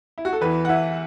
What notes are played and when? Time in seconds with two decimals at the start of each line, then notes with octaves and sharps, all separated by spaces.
0.18 E4
0.25 F#4
0.33 A4
0.41 E2 E3 B4
0.65 F#5
0.69 E2 E3 E5